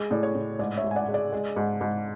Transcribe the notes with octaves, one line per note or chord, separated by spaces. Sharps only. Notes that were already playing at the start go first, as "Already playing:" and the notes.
Already playing: G#3
A2 D5
C#5
A2
G#2 D5
C#5 E5
G#2
G#5
D5 F#5
G#3
D5
G#3
G#2
G#2